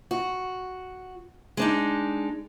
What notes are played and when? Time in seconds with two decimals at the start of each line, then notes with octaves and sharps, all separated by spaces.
0.11 F#4
1.57 G#3 D4 D#4